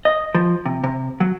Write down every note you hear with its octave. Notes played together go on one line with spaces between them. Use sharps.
D#5
F3
C3
C3
F#3